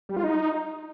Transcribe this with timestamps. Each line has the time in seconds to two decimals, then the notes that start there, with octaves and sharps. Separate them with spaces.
0.09 G3
0.17 F4
0.24 D#4